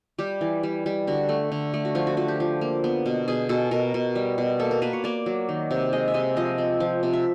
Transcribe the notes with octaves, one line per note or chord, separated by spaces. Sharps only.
G3 G4
E3
G3
G3
D3 F#4
A3
D3
A3
F#4
F3 F4
F#4
F3 F#4
G4
F3
A#3
B3
B2
B2 G#4
B2 A4
B2 A#4
B2
G3
B2
A#3 A4
A#4
A#3 B4
C#5
A#3 D5
F#3
D#3
C3
G#3 D#5
E5
C3 D#5
F3 D#5
C4
F3
C3
E5